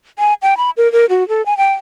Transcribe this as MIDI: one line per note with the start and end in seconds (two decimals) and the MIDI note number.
0.19 0.34 80
0.42 0.57 79
0.57 0.70 83
0.77 0.91 70
0.92 1.06 70
1.10 1.27 66
1.29 1.44 69
1.46 1.57 80
1.57 1.73 79